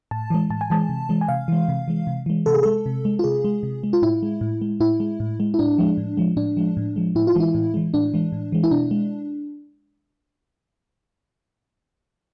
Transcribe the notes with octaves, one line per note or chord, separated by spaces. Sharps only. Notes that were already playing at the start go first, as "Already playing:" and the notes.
A2 A5
E3 G#3
A2 A5
G#5
E3 G#3 A5
C3
E3 G#3
G#5
C3 F5
E3 G#3
C3
E3 G#3
C3
E3 G#3
C3 A4
G#4
G#3 A4
C3
G#3
F4
C3 G#4
G#3
C3
G#3
F4
A2 E4
G#3
A2
G#3
A2 E4
G#3
A2
G#3
E4
A2 D4
F3 G#3
A2
F3 G#3
A2 D4
F3 G#3
A2
F3 G#3
A2 E4
F4
E3 G#3
E4
A2
E3 G#3
A2 D4
E3 G#3
A2
E3 G#3
E4
B2 D4
G#3